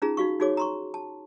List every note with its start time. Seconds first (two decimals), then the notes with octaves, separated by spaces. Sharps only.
0.02 C#4 D#4 F4 G#4 A#5
0.17 D#4 F#4 F5 C#6
0.40 D#4 F#4 G#4 C#5 D6
0.57 A#5 C6 C#6
0.94 A5